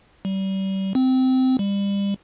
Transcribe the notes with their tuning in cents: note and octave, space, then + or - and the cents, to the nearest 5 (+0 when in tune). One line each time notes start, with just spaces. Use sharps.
G3 -30
C4 -15
G3 +30